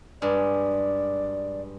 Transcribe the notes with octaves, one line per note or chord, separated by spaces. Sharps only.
G2 G#3 D5